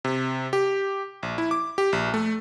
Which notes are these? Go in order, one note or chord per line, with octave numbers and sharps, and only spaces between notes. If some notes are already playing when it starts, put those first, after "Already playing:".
C3
G4
A#1
E4
D6
G4
A#1
A3